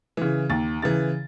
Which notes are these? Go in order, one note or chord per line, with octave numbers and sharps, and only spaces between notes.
C#3 E3
D#2 A6
C#3 E3 A6